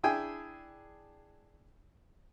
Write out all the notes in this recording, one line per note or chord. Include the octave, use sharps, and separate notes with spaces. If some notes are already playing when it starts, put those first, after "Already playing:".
D4 E4 G#4 G5 G#5